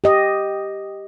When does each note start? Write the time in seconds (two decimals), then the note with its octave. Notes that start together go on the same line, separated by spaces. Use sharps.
0.04 G4 D#5